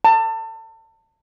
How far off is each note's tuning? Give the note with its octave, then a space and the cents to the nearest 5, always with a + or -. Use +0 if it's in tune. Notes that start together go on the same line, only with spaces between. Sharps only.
A5 +30